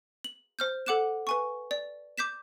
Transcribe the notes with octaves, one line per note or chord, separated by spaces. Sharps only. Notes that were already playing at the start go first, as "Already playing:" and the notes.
F#7
C5 F6 G6
A4 F#5 D6 F#6 E7
B4 G#5 C#6
D5
D6 G6 B6 E7